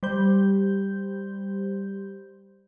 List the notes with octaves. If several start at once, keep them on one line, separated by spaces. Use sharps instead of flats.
G3 C5 G6